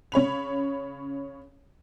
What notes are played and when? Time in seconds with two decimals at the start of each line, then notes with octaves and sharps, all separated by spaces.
0.12 C#3 C#5 B5 F7